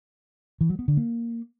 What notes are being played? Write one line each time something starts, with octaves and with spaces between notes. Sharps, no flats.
E3
F#3
B3
D3
A#3